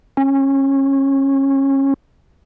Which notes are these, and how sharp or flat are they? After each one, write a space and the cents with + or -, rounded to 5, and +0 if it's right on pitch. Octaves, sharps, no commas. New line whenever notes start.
C#4 -25